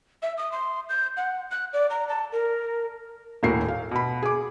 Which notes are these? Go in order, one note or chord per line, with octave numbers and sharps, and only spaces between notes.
E5
D#6
C6
G6
F#5
F#6
D5
A#5
A5
A#4
D#1 A2 F#4 A#4 C7
F5
B2 B5
G#4 D6